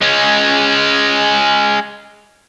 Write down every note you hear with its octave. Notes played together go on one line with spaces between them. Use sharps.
G#3 C#4